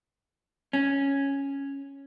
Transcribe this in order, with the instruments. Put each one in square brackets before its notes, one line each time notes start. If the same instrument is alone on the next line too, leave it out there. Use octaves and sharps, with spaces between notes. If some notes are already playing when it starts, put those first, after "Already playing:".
[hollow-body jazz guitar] C#4